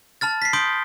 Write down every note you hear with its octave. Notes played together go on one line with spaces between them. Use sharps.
A5 B5 F6 A6
B6 C7
B5 C6 D#6 G6 D7 G7